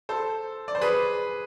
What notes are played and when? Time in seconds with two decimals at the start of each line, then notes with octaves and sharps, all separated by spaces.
0.09 A4 C5
0.68 D5
0.75 C5
0.81 G#4 B4